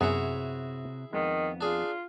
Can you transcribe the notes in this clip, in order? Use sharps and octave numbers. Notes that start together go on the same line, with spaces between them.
F#2 C3 B3 E4 F#4 G#4 C#5
F2 D#3 G#3 B3
D4 F4 G#4